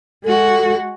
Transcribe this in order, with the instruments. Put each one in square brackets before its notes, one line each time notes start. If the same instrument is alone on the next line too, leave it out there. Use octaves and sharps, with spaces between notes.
[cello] G#3 F#4 [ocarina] A4